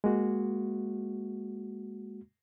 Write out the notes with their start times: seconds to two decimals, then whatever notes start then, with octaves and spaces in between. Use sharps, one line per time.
0.04 G#3 A#3 F#4